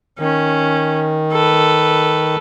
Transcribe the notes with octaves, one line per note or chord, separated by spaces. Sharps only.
D#3 C#4
A4 B4